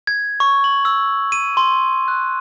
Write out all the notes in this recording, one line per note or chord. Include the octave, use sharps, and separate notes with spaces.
G#6
C#6
F#7
E6
D#7
C6
F#6